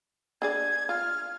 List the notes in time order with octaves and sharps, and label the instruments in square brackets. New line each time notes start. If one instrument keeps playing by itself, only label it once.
[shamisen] D4 G#4 D5 [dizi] G#6
[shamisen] F4 [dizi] F6